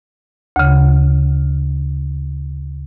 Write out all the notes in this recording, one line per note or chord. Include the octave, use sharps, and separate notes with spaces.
D2 C#3